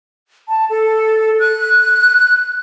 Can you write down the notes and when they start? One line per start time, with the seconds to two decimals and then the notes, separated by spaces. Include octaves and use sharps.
0.49 A5
0.70 A4
1.40 F#6